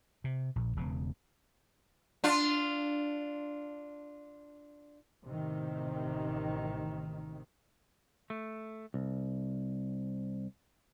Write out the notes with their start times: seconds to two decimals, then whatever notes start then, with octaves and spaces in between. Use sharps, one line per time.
0.24 C3
0.56 A#1
0.76 E1 C#3
2.24 D4 F4
5.25 A1 C3 D#3
8.30 A3
8.94 C2